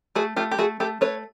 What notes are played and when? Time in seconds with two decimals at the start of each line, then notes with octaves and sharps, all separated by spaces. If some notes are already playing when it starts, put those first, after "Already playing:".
0.15 A3 F#4 G#4
0.36 A3 F4 G4
0.51 G4
0.58 A3 F#4 G#4
0.80 A3 G4 A4
1.01 A3 B4 C#5